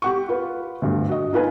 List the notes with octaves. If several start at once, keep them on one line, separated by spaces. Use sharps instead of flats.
G4 F#5 C#6
F4 B4
D2 G2
F#4 D#5
D#4 F4 B4 G#5